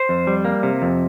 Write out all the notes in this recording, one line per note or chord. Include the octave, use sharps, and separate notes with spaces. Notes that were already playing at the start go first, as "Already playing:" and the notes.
Already playing: C5
F2
G3
A#3
C3
F2